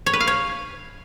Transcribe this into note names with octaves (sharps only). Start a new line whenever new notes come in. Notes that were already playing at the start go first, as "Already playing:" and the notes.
C#5
B4
F5
C#5